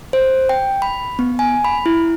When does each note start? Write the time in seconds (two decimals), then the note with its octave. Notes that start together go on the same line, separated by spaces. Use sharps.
0.13 C5
0.49 G5
0.82 B5
1.19 B3
1.39 G#5
1.65 B5
1.86 E4